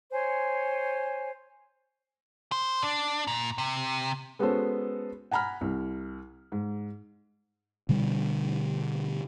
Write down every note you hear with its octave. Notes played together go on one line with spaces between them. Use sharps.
C5 C#5 G#5
C5
D4
A#2
C3
G#3 B3 C#4 F#4 A4 C5
F#5 G#5 A#5 B5 F6
C2
G#2
B2 D3 G3 D4